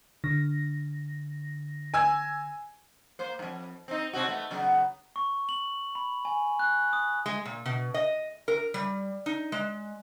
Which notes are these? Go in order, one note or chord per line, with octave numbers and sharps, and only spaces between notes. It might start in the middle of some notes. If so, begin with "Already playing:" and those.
D3 A#6
G#5 E6 G#6
A#3 C5
F2 G#2
C4 D#4
C3 C4 F#4
A3 B3
C#3 F#3 B3
C#6
F#7
B5
G#5
F#6
D#6
G#3
A#2
B2
D#5
A#4
G3
D#4
G#3